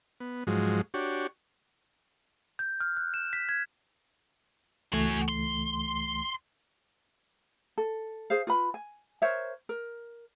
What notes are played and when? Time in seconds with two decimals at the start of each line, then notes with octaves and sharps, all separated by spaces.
0.20 B3
0.47 G#2 F3 F#3 G#3
0.94 D4 F#4 G4 C#5
2.59 G6
2.80 F6
2.97 F#6
3.14 E7
3.33 B6
3.49 G#6
4.93 C#2 E3 A3 F#4 G#5
5.29 C6
7.78 A4
8.30 G#4 C5 F5
8.47 F4 B4 B5
8.74 G#5
9.22 A#4 C5 C#5 E5
9.69 A#4